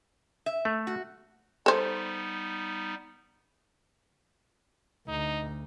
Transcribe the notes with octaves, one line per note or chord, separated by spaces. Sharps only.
E5
A3
F#4
G3 B3 D#4 A4 C5
D2 D#4